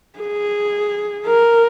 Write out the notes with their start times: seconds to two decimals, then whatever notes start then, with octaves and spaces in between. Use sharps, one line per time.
0.19 G#4
1.26 A#4